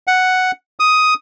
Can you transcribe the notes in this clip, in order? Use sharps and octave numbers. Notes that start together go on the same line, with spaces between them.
F#5
D#6